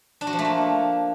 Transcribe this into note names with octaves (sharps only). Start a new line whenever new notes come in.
D4
F#4
F3
A3
A#3